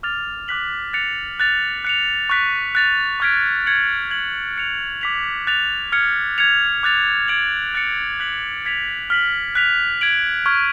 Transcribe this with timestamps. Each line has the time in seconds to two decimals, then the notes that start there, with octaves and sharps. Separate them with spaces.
0.03 D6 F6 A6 F7
0.48 D6 F#6 B6 F#7
0.93 F#6 A6 C#7 F7
1.40 F#6 A6 F7
1.85 F#6 C#7 F7
2.30 C#6 F#6 B6
2.75 F#6 A6 F7
3.20 C#6 F6 G#6 B6 D7
3.66 G#6 C#7 F#7
4.11 G#6 B6 F#7
4.57 F#6 C#7 F7
5.01 D6 G#6 B6 F7
5.47 F#6 A6 F7
5.92 F6 G#6 C#7
6.38 G#6 C#7 F7
6.83 D6 F#6 A6 F7
7.28 G#6 D7 F#7
7.75 F#6 A6 C#7
8.20 F#6 B6 F#7
8.65 G#6 B6 F7
9.10 F6 B6 F#7
9.55 F#6 B6 F7
10.01 G#6 D7 F#7
10.46 C#6 F6 G#6